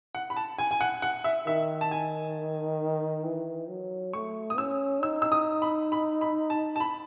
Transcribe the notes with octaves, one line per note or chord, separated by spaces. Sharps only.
F#5
B5
A5
G#5
G#5
F#5
F#5
E5
D#3 E5
A5
G#5
E3
F#3
A3 C#6
D#6
C#4 E6
D#4 E6
E6
D#6
B5
B5
B5
A5
A5
B5